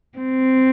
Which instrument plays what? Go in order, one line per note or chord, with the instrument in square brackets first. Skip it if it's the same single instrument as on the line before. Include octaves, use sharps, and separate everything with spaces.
[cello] C4